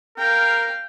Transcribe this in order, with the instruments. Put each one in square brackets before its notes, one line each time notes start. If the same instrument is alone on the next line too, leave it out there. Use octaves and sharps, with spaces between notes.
[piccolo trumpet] A#4 [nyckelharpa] F5 G5